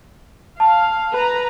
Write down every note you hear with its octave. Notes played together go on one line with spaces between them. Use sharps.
F5 A5
B4 A#5